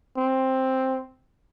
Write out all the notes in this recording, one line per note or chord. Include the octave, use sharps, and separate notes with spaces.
C4